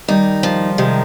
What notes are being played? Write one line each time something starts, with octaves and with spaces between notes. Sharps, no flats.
D#3 G3 D#4
F3
C3 D#3 G#3